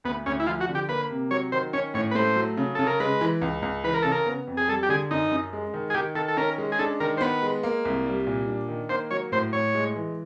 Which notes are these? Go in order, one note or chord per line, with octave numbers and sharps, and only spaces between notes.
D2 B3
D2 C#4
E4
F3 F4
F#4
D3
G4
A#3 B4
C3
F#3 C#5
D#3 C5
C#4 C#5
A2 C#5
B4
A3 C5
F#3
C#3
C#3 A4
A#4
G#3 B4
E3
C#2
C#2
E3 B4
A#4
C#3 A4
A#4
B3
F2
G#4
G3 A4
G4
D3 G#4
F#2 D#4
F#2
G#3
D#3
G#4
D#3 G4
D#3 A4
A4
C#4 A#4
G#3
G#4
D4 A4
D#3 A#4
C5
B3 B4
G#3
A#3
C2
G3
A#2
D4
D#3
A#3 C5
F#3 C#5
A2 C5
A2 C#5
G#3
E3